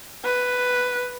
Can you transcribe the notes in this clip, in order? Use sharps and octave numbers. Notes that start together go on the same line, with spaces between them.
B4